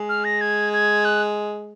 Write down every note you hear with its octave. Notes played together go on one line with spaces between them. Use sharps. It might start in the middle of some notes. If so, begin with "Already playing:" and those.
Already playing: G#3
F6
A#6
G#6
G#6
F#6